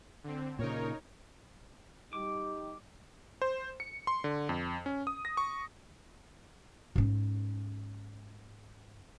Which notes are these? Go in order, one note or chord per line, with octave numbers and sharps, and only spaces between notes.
D3 C4
A#2 C#3 D#4 A#4 C#5
G3 D#4 G4 D6
C5
C#7
C6
D3
F2
C#4
D#6
A#6
C#6
G#2 C#4